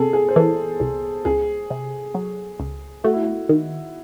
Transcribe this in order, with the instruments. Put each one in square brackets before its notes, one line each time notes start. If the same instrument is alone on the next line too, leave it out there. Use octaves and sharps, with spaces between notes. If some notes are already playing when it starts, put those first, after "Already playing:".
Already playing: [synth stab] C3 [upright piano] G#4 A4
[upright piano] G#4
C5
[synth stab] E3 [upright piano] A4
[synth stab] C2
[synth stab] C#2 [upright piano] G#4
[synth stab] C3
F#3
C#2
[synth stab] A3 [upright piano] F#4
[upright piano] E4
F#4
[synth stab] D#3